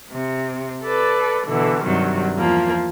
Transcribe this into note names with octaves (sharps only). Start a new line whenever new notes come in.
C3
A4 B4 D5
B2 D3 E3
G2 C3 D#3 F#3
E2 F3 A#3